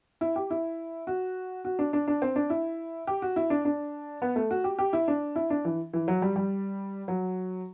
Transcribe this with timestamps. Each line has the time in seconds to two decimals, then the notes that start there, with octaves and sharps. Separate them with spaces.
0.21 E4
0.36 G4
0.50 E4
1.07 F#4
1.65 F#4
1.79 D4
1.93 D4
2.08 D4
2.22 C4
2.36 D4
2.50 E4
3.07 G4
3.22 F#4
3.36 E4
3.50 D4
3.65 D4
4.22 B3
4.36 A3
4.51 F#4
4.64 G4
4.79 G4
4.93 E4
5.08 D4
5.36 E4
5.50 D4
5.65 E3
5.93 E3
6.08 F#3
6.22 G3
6.36 G3
7.08 F#3